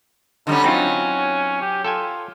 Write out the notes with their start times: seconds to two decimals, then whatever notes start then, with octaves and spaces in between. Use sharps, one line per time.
0.47 D3 G3 C#4 D#4
0.64 F#3 C4 C#4 D#4 F4
1.61 G4
1.85 F4 A4 G5 G#5